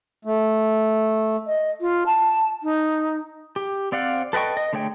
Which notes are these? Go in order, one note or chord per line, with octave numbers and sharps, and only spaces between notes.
A3
D#5
F4
A5
D#4
G4
C4 D5 F5 F#5
A4 B4 D#5 G5 C#6
D#5
D3 A3 G#4 C#5 G5